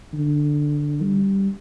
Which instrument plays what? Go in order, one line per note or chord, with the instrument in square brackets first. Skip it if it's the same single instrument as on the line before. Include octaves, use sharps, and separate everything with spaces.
[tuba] D3
G3